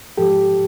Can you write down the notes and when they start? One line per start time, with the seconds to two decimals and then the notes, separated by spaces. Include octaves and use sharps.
0.17 G#2 F3 G#3 G4 A4